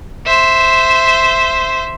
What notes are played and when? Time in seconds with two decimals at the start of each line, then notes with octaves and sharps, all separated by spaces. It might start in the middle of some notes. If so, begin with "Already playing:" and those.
0.26 C5 E5